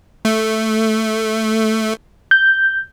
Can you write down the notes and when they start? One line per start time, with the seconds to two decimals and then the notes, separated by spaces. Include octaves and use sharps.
0.25 A3
2.31 G6